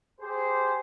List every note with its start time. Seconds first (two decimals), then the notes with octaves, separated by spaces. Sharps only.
0.21 G4 G#4 C5